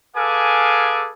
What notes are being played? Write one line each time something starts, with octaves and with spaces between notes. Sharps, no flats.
G#4 A4 B4 F5 G#5 D6